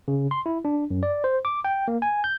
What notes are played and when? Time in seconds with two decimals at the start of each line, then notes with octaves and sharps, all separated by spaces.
0.08 C#3
0.31 C6
0.46 E4
0.65 D4
0.90 F#2
1.03 D5
1.24 C5
1.45 D6
1.65 G5
1.88 A#3
2.02 G#5
2.24 G6